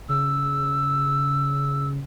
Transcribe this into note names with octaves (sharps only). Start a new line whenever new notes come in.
C#3 E6